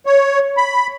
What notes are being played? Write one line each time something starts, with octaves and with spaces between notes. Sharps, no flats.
C#5
B5